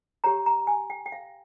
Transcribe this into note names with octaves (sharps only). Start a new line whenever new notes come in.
G4 C#5 A#5
A#5
G#5
G5
G5
F5